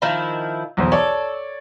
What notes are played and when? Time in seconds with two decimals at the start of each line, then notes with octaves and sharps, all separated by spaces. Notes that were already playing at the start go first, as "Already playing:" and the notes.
0.02 D#3 F3 E4
0.77 B1 E2 C5
0.92 A4 C#5 D5